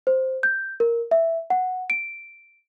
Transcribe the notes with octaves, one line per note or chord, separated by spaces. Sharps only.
C5
G6
A#4
E5
F#5
D7